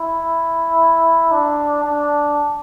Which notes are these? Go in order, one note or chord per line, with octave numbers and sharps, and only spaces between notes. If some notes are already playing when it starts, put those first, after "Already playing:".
Already playing: E4
D4
D4